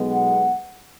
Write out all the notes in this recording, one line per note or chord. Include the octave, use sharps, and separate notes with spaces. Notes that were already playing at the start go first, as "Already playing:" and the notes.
Already playing: B1 B2 G#3 B3
F#5